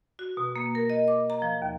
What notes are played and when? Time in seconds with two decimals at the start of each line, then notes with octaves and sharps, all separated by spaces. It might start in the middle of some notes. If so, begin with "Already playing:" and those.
0.19 F#4
0.37 B2
0.56 A#3
0.75 A#4
0.90 D#5
1.08 D6
1.30 A#5
1.42 F3
1.62 D#2